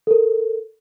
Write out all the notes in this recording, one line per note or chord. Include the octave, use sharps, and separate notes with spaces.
A4 A#4